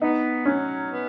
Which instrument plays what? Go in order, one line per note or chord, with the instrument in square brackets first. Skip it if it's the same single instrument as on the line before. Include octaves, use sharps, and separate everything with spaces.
[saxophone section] B3 [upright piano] D#4
[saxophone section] F#3 [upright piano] C#4
[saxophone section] B3